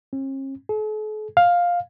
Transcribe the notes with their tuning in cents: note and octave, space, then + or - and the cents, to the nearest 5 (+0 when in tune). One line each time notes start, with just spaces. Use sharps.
C#4 -45
A4 -45
F5 +10